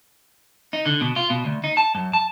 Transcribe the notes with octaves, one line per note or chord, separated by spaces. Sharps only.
D#4
D3
B2
F4
B2
D2
D#4
A5
F#2
A5